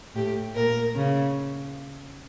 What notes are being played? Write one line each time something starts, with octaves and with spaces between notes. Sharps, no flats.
A2 G4
A#2 A#4
C#3